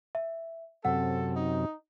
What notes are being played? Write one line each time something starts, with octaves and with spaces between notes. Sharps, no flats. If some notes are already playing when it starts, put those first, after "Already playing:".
E5
F#2 C3 C4 A4 F#5
D#4